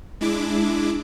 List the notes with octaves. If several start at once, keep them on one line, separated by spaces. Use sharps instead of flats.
G#3 D4 E4 D6